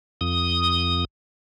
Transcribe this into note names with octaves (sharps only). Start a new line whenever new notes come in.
F2 D#6